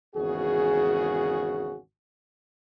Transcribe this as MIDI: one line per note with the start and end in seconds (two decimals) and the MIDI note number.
0.16 1.77 32
0.16 1.77 40
0.16 1.77 49
0.16 1.77 66
0.16 1.77 68